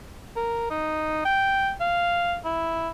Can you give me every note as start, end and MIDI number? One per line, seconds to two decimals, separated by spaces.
0.36 0.66 70
0.70 1.22 63
1.25 1.72 79
1.80 2.37 77
2.45 2.90 64